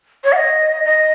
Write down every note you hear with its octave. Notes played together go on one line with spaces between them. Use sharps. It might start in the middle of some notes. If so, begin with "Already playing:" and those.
C#5
F#5
D#5
D#5